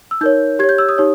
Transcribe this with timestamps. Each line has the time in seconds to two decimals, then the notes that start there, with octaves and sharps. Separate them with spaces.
0.11 E6
0.21 D#4 A#4 C#5 G6
0.59 G4 G#6
0.64 C#5
0.69 G6
0.78 E6
0.89 D#6
0.98 D#4 G4 C#5